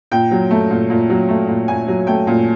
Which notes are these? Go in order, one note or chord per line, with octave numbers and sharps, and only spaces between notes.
A#2 G5
F#3
A3
A#2
A#2
F#3
A3
A#2
A#2 G#5
F#3
A3 G5
A#2